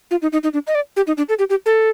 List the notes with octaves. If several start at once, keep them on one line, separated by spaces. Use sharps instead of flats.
F4
D#4
D#4
D#4
D4
D#5
D5
G4
D#4
D4
A4
G4
G4
A4